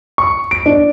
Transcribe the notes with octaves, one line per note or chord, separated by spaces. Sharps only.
C#6
D7
D4